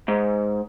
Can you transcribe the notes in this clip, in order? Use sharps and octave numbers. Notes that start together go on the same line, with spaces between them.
G#2